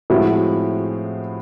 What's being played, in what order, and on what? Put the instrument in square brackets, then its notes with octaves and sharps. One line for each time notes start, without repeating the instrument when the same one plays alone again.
[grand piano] A2 F3 G#3 C4 [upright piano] E4 F#4